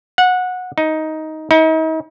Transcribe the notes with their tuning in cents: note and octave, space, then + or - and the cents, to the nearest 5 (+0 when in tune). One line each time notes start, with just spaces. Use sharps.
F#5 -20
D#4 +10
D#4 +40